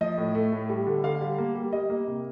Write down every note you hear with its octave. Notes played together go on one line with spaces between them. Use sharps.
F3 D#5
A2
A3
A2
G3
D3
D3 F5
G3
A#3
G3
G3 D#5
A#3
C3